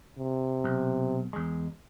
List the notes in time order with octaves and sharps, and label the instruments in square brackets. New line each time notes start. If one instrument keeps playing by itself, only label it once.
[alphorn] C3
[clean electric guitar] B1
E2 G#3